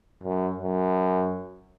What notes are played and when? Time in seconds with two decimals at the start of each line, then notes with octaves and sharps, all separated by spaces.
0.23 F#2
0.59 F#2